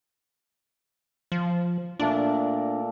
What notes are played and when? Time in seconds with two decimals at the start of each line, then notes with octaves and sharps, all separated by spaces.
1.32 F3
1.99 A#2 A3 D4 A#4